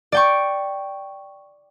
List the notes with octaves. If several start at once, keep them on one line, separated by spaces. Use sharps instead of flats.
D5 G5 C#6